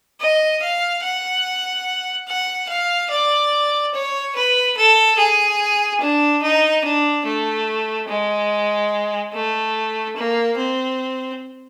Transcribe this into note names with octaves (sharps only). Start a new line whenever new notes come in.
D#5
F5
F#5
F#5
F5
D5
C#5
B4
A4
G#4
D4
D#4
D4
A3
G#3
A3
A#3
C4